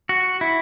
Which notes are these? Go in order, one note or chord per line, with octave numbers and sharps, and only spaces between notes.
F#4
E4